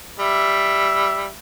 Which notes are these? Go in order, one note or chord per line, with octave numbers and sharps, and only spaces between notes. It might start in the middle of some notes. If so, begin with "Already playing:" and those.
G3 E5